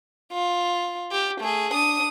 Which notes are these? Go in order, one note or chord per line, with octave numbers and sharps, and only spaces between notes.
F4
G4
A3 G#4
D4 D#6